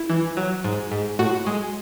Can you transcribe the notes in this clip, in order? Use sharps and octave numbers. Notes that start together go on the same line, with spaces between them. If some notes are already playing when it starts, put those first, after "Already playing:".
Already playing: E4
E3
F#3
G#2
G#2
A2 F#4
G#3